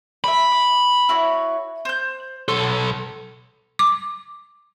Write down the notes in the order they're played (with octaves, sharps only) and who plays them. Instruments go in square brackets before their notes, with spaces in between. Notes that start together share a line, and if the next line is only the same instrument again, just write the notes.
[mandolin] D5 E5 [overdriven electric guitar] B5
[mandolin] D6
E4 F#4 C#5
C5 G6
[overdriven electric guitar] B1 A4 [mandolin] C#5 C6
[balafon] D6